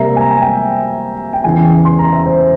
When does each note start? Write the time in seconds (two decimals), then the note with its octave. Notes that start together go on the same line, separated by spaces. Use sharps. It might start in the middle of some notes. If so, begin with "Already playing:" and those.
Already playing: C3 G3 A#3 E5 A#5
0.16 G#5
0.21 A#5
0.30 G#5
0.41 G5
1.33 G5
1.44 E2 C#3 E3 G#5
1.85 C6
1.99 A#5
2.13 E5
2.26 C5